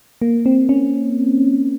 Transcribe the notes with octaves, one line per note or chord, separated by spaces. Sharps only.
A#3
C4
C#4